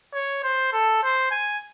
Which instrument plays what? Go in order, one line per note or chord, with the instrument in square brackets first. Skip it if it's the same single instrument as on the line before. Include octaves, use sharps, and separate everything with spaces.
[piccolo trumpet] C#5
C5
A4
C5
G#5